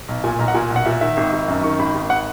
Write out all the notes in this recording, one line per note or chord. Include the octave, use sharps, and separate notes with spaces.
B1
A#2 G#5
B1 A#5
F#5
A#2 G#5
B1
F#5
A#2 E5
D#3 E5
G#1
G#1
F#2
D#3 C#6
G#1 B5
G#1
F#5